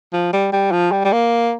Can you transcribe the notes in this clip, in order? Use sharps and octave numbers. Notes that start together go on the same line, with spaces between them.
F3
G3
G3
F3
G3
G3
A#3